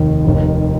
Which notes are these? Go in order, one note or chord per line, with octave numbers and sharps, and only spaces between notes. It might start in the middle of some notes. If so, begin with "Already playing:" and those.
Already playing: F1 D#2 D#3
F1 D#2 D#3